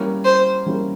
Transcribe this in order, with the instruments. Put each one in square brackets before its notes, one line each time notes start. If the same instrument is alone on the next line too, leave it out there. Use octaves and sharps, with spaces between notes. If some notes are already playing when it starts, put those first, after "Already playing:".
Already playing: [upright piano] G3 A#3 C#4 E4
[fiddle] C5
[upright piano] G3 A#3 C#4 E4